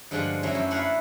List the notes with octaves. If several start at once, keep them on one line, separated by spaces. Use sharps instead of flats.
G2 D3 F3 G#3 F4 F#5
F#3 A3 A#3 C#4 E4 F#4
F#2
D4 E4 A4 B4 F5 F#5